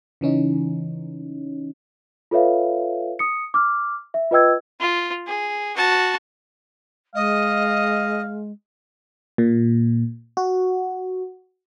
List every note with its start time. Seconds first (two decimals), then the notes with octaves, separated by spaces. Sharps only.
0.21 C#3 E3 C#4 D#4
2.31 F4 A4 B4 C#5 E5 F5
3.19 D#6 C#7
3.54 D6 F6
4.14 E5
4.31 F4 B4 D#5 G5 E6 G#6
4.80 F4
5.27 G#4
5.77 F#4 A5
7.15 G#3 D#5 F5
9.38 A#2
10.37 F#4